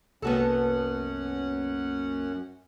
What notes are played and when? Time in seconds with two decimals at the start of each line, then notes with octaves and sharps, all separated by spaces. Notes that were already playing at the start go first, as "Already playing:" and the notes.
0.22 C2 F#2 A#3 B3 C#4 F#4 A4 F#5